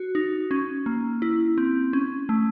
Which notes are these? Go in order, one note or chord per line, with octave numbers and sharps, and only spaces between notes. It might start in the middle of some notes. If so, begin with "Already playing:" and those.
Already playing: F#4
D#4
C#4
A#3
E4
C4
C#4
A3